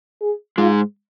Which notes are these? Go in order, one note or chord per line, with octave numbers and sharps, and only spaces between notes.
G#4
G#2 G#3 F4